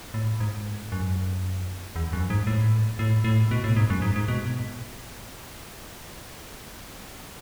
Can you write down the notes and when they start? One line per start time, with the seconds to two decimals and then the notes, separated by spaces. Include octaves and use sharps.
0.14 A2
0.40 G#2
0.92 F#2
1.96 E2
2.13 F#2
2.30 G#2
2.47 A2
2.99 A2
3.24 A2
3.51 B2
3.64 A2
3.76 G#2
3.90 F#2
4.02 G#2
4.16 G#2
4.28 B2